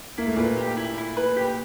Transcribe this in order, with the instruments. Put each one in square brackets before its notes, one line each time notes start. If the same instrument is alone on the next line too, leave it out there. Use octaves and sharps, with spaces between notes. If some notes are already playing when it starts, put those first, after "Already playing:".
[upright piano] A#3 [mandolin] E4
[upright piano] A3
[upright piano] A#2 A#3 [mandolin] B4
[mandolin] G4
E4
E4
B4
G4